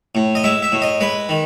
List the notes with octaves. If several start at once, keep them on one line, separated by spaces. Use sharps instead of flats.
A2
D#5
G#3 E5
E5
A2
D#5
G#3 B4
D#3